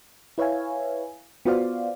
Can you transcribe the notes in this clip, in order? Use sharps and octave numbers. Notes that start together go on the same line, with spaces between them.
E4 B4 C#5 E5 F5 G#5
B3 F4 F#4 C5 D5 F5